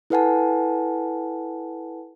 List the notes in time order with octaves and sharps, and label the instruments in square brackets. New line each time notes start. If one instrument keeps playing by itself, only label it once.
[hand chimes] E4 A4 B4 F#5 G#5 A5